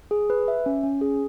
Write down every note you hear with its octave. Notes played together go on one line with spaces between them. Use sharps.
G#4
B4
E5
C#4
C#4
G#4